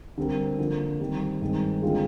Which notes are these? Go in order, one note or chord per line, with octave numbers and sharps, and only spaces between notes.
D3 G3 C4 G4 A#4
D3 F3 A#3
D#3 G3 C4
G2 D#3 G#3 C4 D#4
D3 G#3 C4 F4 G#4